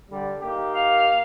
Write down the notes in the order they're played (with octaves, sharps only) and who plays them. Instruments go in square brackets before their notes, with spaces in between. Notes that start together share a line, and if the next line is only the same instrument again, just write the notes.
[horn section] D3 G3
A#3 D#4 G4
[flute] F5